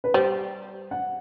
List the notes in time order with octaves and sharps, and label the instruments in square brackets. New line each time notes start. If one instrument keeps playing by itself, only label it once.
[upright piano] B4
[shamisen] G3 [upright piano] C5
[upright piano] F#5